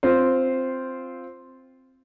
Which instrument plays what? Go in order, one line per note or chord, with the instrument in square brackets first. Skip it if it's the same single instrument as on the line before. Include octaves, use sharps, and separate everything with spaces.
[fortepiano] C4 F4 C5